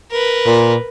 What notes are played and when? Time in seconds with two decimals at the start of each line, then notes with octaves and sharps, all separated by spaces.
0.11 A#4 B4
0.46 A#2